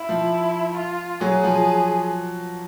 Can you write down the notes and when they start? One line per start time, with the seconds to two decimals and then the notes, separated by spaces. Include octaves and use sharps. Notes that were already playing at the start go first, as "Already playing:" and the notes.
Already playing: E4
0.09 F3
0.77 F4
1.21 F#3 G#4
1.43 F3